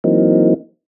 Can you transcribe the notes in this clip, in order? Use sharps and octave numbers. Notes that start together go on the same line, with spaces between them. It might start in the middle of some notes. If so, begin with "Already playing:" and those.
E3 F#3 A#3 C4 D#4